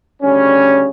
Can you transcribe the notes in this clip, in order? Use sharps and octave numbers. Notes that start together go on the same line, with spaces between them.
D2 C#3 G3 C#4